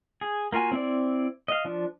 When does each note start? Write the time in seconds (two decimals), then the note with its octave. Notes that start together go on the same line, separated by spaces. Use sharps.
0.21 G#4
0.52 A#3 F4 F#4 G#5
0.71 C4 E4 D5
1.48 D#5 F5
1.65 F3 D4